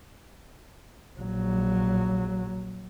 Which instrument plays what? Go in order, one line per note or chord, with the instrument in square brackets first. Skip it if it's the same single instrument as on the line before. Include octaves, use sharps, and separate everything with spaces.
[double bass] A#1 F#3